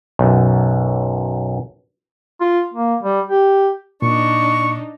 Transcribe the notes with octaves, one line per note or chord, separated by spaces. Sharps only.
B1 F#2
F4
A#3
G3
G4
A#2 D4 D#4 C#6